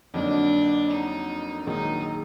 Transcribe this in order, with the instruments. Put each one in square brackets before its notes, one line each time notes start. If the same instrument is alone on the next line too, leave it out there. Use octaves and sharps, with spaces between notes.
[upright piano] F2 D3 F#3 A#3 D#4 [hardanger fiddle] D4
[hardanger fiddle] D#4
[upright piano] A#1 G#2 D#3 F#3 A#3 [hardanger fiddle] D#4